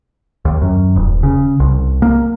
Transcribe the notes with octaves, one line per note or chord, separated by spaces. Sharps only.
D#2
F#2
D#1
C#3
C2
A#3